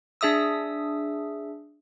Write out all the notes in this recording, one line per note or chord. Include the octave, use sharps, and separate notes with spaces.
D4 G#4 E5 D#6 E6